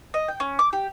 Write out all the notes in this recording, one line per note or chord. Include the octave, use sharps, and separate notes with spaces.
D#5
G5
C#4
D6
G4